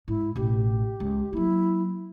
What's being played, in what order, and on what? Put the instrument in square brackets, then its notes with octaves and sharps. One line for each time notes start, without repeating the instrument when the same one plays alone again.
[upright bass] G#2 [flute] E4
[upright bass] A1 B2 [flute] G4
[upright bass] C#2
[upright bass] F#3 A#3 [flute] E4